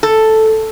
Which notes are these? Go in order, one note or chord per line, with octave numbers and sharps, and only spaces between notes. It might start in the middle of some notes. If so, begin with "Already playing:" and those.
A4